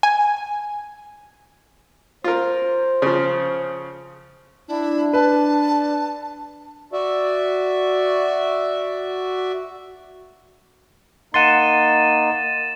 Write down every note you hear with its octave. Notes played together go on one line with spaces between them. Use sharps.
G#5
F4 A#4 C5
C#3 F3
D4 E4
B4 A5
F#4 D5 E5
A#3 D#4 F#5 C6 A6 D#7 E7